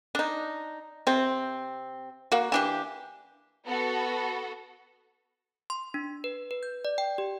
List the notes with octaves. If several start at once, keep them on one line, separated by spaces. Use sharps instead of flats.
D4 D#4
C3 C4
A#3 F#4
E3 D4 G4
B3 F#4 A4
C6
D4
B4
B4
G6
D5
G5
G4